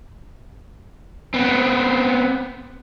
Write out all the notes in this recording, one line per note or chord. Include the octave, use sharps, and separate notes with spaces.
B3 C4